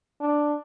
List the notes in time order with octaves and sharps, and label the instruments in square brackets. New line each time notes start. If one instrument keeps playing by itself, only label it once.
[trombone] D4